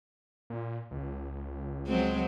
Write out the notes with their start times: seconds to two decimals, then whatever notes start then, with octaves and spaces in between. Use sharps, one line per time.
0.50 A#2
0.91 C#2
1.87 F#3 G#3 C4